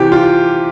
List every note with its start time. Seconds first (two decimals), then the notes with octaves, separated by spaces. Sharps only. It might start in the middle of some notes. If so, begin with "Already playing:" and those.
Already playing: C3 E3 G4
0.12 F4